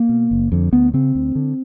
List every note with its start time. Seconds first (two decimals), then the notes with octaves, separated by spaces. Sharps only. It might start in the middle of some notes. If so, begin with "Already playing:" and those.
Already playing: A#3
0.09 B2
0.31 F#1
0.52 F2 D3
0.73 D2 B3
0.94 C#3 C4
1.15 D2
1.35 D3